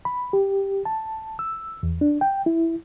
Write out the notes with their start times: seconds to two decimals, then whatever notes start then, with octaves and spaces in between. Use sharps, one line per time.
0.05 B5
0.33 G4
0.85 A5
1.39 E6
1.83 E2
2.01 D4
2.21 G5
2.46 E4